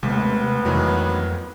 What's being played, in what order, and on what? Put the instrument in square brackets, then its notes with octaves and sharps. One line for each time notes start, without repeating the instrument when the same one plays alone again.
[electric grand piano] D#2 B6 [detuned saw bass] C3 [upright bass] G#3 A3 [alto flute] B3
[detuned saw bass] F2 [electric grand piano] D#3 E3 F#3